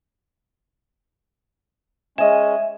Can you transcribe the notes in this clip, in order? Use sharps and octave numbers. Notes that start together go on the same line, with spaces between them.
G#3 C#4 D#5 E5 G#5